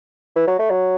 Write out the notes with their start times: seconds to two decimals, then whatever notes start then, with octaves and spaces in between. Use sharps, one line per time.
0.36 E3
0.47 F#3
0.59 A3
0.70 F#3